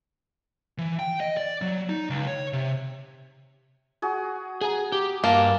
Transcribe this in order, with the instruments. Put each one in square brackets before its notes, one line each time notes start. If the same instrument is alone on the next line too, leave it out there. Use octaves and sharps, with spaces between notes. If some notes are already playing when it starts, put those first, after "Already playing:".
[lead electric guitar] E3
G5
D#5
D5
F#3
D#4
C#2
C#5
C3
[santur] F#4 G#4
[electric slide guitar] G#4 [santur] G#5 A#5
[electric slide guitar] G4
[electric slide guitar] G2 A5 [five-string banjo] A#3